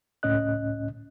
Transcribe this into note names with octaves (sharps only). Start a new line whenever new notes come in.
C#2 A2 C#4 D#5 F#6